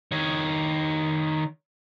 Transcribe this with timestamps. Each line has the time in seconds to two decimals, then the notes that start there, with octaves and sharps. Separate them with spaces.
0.12 D#3 C#5